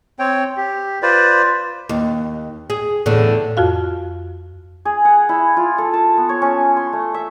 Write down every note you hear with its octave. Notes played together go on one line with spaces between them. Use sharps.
C4 C#5 G5
G4
F4 B4 C5 D5
D#2
G#4
E2 A2 D3
F2 F4 F#4 F5
G#4
F#5
E4
F4
A4
A5
B3
C#5
C#4
C6
A3
E5